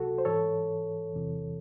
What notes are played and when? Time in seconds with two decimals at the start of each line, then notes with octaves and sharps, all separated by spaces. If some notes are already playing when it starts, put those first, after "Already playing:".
Already playing: C#2 C3 F#3 F#4 A4
0.18 C5
0.25 G#2 E3 A4 C#5
1.13 E2 C3 E3